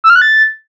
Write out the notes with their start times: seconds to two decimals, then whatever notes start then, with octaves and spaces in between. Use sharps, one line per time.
0.04 E6
0.10 F6
0.16 F#6
0.22 A6